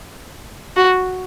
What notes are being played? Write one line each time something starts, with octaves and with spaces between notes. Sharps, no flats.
F#4